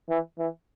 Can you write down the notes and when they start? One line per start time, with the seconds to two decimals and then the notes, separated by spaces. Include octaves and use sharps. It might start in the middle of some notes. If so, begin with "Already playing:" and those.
0.09 E3
0.38 E3